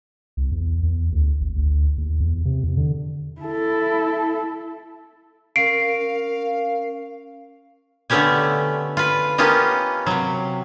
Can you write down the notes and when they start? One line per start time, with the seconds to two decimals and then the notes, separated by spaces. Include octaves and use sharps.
0.37 C2
0.52 E2
0.83 E2
1.12 D2
1.41 G#1
1.56 D2
1.98 D#2
2.20 E2
2.45 C3
2.64 E2
2.77 D3
3.42 E4 A4
5.56 C#4 A#4 F5 C7 D7
8.10 D3 A3 B3 C#4 G4 G#5
8.97 F4 B4
9.38 A#3 B3 C#4 F4 G4 D#5
10.06 C3 F#3